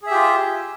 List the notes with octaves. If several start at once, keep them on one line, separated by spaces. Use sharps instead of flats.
F4 G4 G#4 E5